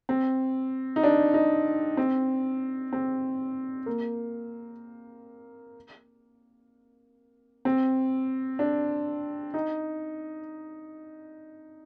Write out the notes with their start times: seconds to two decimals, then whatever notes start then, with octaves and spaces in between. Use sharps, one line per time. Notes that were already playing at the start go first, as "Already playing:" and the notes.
0.09 C4
0.96 D#4
1.04 D4
1.34 D#4
1.97 C4
2.93 C4
3.86 A#3
7.65 C4
8.59 D4
9.54 D#4